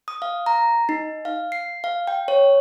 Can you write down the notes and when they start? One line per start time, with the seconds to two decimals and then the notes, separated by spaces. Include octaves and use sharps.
0.08 D#6
0.22 F5
0.46 A#5
0.89 D#4
1.25 F5
1.52 C7
1.84 F5
2.07 G5
2.28 C#5